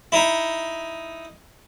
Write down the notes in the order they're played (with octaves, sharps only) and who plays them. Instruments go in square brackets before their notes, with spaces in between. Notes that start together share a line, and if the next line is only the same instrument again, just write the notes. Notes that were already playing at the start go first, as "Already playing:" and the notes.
[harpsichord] D#4 E4